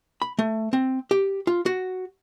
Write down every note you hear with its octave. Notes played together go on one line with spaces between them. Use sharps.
B5
A3
C4
G4
F4
F#4